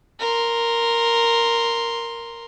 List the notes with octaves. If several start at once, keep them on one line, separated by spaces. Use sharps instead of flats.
A#4 C6